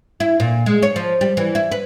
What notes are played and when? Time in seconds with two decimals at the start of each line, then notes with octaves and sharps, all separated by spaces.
0.20 E4
0.40 A#2
0.66 G#3
0.83 C#5
0.96 F3
1.21 G3
1.37 E3
1.55 E4
1.71 B4